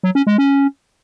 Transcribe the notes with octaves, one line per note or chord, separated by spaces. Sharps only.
F#3
C#4
G#3
C#4